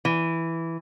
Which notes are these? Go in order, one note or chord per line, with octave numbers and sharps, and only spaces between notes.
E3